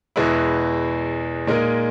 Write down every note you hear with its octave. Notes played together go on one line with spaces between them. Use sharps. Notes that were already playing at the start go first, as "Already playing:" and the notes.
E2 B2 G#3 B3 E4
A#2 G#3 D#4 A#4